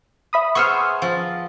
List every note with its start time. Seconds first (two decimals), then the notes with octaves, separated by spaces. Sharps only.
0.33 E5 B5 D#6
0.55 B3 G#4 C5 C#6 E6 F6
1.02 F3